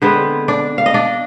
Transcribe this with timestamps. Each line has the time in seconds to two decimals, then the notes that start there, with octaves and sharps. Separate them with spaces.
0.02 D3 G#3 B3 C4 B4
0.48 D4 D5
0.78 F5
0.86 D#5
0.94 D4 D5